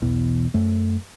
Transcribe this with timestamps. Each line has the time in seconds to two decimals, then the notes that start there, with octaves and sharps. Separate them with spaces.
0.02 B1 E2 B2 E3
0.54 F#2 A3